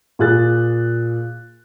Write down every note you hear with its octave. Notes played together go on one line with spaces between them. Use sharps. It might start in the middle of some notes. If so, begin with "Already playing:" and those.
A#2 G#4 F#6 A6